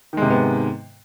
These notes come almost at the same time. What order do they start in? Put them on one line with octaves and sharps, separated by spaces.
D#3 G#3 C3 G#2 B3